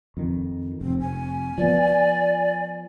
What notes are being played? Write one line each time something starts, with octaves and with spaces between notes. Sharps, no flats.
F2 D#3
F1 C4
G#5
F3 B3 D5